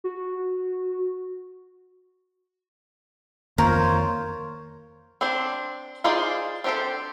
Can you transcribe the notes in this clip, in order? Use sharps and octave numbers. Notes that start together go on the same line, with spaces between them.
F#4
F2 D#3 A#3 F4 A#4 C5 C#5
C4 D4 C5
D#4 F4 G#4 C5 D5
C4 D4 G4 A4 C5